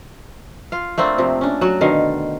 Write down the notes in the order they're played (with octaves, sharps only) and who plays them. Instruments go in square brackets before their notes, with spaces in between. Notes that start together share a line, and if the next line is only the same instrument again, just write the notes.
[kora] F4 F5
A3 A#3 C4 D4
C3 F3
C#4 D4
F#3 F#4
B2 D3 D#3 F5